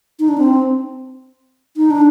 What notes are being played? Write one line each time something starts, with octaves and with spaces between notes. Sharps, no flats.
D#4
D4
C4
D#4
D4